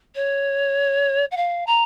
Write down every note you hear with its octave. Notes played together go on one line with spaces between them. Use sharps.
C#5
F#5
F5
A#5